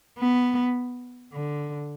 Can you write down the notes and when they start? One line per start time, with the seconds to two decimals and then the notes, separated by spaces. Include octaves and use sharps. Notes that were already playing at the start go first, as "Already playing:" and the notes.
0.19 B3
1.34 D3